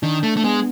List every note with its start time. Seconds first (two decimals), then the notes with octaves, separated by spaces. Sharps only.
0.03 D#3 D4
0.23 A3
0.37 A3
0.44 G#3 B3